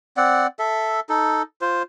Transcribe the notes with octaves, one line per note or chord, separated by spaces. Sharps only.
C4 D5 F#5
A4 E5
D#4 A4
F4 C5